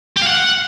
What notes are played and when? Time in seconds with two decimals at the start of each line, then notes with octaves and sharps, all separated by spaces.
0.17 G4
0.22 F5
0.27 F#5